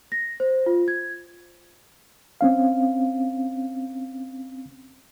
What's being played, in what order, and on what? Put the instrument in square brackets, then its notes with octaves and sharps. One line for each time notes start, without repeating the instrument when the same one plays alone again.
[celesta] A#6
C5
F4
G#6
[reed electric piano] C4 C#4 F5